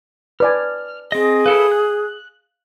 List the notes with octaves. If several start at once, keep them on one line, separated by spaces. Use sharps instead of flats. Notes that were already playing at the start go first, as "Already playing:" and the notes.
B4 D5 G#5 F6
C4 G#4 D#5
E4 A4 B4 F5
F#6